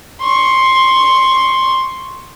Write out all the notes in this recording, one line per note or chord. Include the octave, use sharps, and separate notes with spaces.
C6 C#6